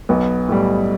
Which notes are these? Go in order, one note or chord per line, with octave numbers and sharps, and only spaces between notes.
B1 B3
A2 G3